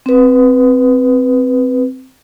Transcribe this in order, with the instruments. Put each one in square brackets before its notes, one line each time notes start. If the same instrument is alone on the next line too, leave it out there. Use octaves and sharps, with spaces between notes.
[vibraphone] C4 B4